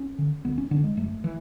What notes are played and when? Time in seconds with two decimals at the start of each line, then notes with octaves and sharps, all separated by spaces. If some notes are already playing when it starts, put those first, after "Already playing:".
Already playing: C#4
0.19 D3
0.45 D2 B3
0.58 C#4
0.71 D3 D4
0.84 G#3
0.97 F#1 A3
1.24 E3